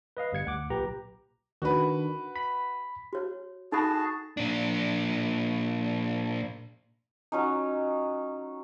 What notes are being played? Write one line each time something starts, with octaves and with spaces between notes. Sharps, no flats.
B4 D#5 F5
G1 G3 G#6 C#7
D2 F#5 D6
B1 A#2 G4 B4 A#5
D#3 D4 F#4 B4
B5 B6
F#4 C#5
D#4 F#4 G#4 A4 A5 B5
A#2 D4
F#3 C#4 D#4